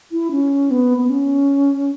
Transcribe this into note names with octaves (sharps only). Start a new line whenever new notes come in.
E4
C#4
B3
B3
C#4